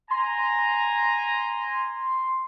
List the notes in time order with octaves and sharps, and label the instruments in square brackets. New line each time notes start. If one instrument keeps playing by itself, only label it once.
[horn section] G#5 A#5 [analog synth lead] C6